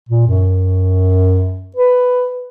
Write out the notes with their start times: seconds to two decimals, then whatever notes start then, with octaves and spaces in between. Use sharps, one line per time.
0.09 A#2
0.27 F#2
1.76 B4